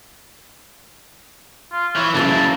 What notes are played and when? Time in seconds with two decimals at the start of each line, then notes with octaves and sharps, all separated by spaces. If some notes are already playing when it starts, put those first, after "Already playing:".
1.73 F4
1.96 E3 C#5
2.15 F#2 A2 C#3 E3 A#3 A5